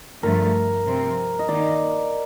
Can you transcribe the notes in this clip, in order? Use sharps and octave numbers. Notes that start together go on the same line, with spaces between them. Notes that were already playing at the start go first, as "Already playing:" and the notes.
G2 D3 F3 A3 A#4
C3 F3 C4
D#5
D#3 A#3 D#4 D5